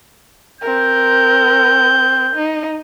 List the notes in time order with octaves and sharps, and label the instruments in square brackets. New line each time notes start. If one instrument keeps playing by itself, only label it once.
[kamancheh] C4 A#4 [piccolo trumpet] G6
[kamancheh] D#4